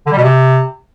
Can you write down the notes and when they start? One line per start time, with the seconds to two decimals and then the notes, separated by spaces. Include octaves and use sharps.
0.06 D3
0.12 G3
0.17 B2
0.23 C3